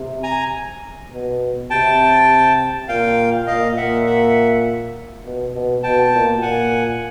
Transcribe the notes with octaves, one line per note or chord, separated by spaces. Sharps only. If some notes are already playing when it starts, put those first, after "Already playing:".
Already playing: C3
G#5 A#5
B2
C3 G5 A5
A#2 F5 G5
A#2 D#5 F5
A#2 E5 F#5
E5 F#5
B2
B2
B2 G5 A5
A#2
A#2 F#5 G#5